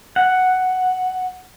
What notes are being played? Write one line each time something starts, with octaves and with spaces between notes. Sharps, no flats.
F#5